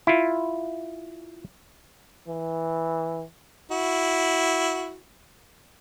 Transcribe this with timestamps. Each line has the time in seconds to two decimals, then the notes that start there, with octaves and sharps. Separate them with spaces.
0.07 E4 F4
2.28 E3
3.71 E4 F#4